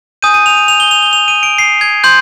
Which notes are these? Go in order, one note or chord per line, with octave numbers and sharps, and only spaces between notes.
G#5 D#6 G6 D#7
D#7
F7
D#7
F7
G7
F7
G7
F7
D#7
D7
C7
G#6
C6 G6